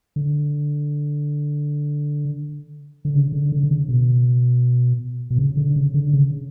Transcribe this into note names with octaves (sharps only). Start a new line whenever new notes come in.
D3
D3
C#3
D3
D3
D3
C#3
B2
B2
C#3
D3
C#3
D3
C#3